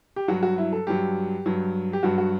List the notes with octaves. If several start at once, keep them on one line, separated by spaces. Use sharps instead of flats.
G4
G2 F#3 F#4
F#4
E4
A4
G2 F#3 G4
G2 F#3
G4
G2 F#3 F#4
F#4